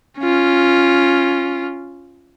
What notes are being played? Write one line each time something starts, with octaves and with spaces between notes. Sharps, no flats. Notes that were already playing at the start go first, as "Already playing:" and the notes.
C#4 F4